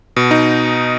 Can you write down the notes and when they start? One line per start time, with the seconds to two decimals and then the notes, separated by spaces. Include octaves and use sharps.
0.16 B2
0.31 D#4